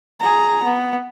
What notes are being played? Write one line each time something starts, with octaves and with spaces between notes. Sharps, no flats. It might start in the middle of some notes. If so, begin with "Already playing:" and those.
G#4 A#5
B3